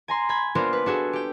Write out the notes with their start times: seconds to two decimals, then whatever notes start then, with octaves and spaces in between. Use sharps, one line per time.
0.08 G#5 A#5 C6
0.29 B5 G#6
0.55 A#3 B3 D4 F4 A#4 C5
0.73 B4
0.86 D4 F#4 G#4 A4
1.13 G4 G5